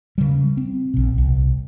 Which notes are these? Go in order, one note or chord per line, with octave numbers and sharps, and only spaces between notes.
C#3 G3
C4
A#1 B2
C2